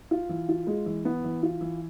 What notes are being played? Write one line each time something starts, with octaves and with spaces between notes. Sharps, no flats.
F4
E3
F4
G#3
E3
B3
E3
F4
E3